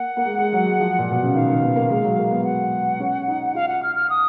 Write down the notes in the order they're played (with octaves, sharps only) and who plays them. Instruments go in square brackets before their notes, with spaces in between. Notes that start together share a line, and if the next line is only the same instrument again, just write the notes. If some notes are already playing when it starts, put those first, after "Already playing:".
Already playing: [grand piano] A#3 [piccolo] F#5
[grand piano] A#3
G#3
G#3
F#3
G#3
F3
A#2
B2
C#3
[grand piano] D#3 [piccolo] F5
[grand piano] D#3
B3
A#3
G#3
F#3
A#3
B3
[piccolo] F#5
[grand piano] C#4
D#4
[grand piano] F4 [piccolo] F5
[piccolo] F#5
F6
F6
D#6